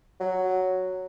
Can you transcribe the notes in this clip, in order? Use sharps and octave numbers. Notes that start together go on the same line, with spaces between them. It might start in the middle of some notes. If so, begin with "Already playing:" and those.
F#3